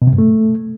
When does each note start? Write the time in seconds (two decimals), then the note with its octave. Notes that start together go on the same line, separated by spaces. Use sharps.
0.02 B2
0.07 C3
0.13 G2
0.18 A3